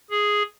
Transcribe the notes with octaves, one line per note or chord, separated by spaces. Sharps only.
G#4